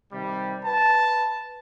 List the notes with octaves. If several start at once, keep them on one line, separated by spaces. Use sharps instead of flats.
C3 D#3 G3
B4 A5